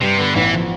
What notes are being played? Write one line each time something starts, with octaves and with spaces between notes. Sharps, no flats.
G2 C3
D3 B3
A1 E3
F3